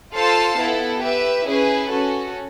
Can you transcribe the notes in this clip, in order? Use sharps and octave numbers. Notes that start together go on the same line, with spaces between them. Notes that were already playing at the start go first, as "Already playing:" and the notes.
F4 A4 C5 F5 A5
B3 E4 A4
G4 B4 E5
C#4 E4 G#4 B4
C#4 F#4 A4